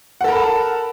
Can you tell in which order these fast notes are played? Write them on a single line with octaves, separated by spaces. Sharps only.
F#5 A4 A#4 B5 A5